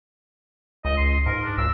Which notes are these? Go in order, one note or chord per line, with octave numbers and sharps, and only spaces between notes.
C#2 D#5
C6
G#2 A#4
D4
C#2 E6